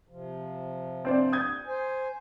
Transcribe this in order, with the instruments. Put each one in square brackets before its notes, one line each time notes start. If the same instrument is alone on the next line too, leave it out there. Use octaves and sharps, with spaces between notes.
[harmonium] C3 F3
[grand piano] C4 C5 D5
D#6 G6 G#6
[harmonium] C5 G#5